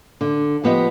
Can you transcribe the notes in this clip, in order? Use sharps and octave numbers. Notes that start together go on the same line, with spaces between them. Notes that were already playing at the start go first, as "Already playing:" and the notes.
D3
F3 B3 G4 D#5